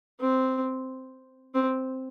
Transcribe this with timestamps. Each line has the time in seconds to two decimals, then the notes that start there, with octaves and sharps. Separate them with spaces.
0.20 C4
1.55 C4